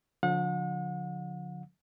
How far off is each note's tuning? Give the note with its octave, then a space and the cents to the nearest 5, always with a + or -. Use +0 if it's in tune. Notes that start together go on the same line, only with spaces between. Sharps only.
D3 -25 F3 +30 F#5 -40